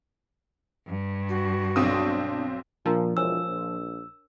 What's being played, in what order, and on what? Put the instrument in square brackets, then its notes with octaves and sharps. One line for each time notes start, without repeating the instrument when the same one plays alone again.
[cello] G2
[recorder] F#4
[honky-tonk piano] B1 C4 D#6 [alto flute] D4
[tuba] A#2 [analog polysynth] F3 [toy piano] D4 A#4 A#5
[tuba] E1 [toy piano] A#4 C#5 G#5 [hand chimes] E6
[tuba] A#1